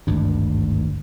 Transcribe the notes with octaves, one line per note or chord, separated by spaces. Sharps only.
G#1 D2 G2